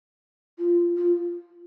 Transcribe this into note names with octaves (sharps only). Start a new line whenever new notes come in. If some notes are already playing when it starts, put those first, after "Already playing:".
F4
F4